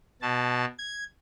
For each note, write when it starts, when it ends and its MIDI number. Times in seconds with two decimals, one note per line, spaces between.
0.22 0.65 47
0.22 0.65 81
0.78 1.04 92